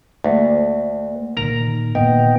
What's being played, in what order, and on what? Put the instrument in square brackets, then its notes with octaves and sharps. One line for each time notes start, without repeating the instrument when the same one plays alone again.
[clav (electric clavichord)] D2 [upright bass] A3 A#3
[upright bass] A#2 D#3 [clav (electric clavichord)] A#4 A#5
[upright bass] A#2 D#3 [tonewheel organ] B3 D#5 G5